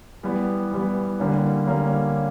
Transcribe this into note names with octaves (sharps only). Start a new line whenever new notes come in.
E3 G3 B3
E3 G3 B3
D3 G3 A#3 C#4
D3 G3 A#3 C#4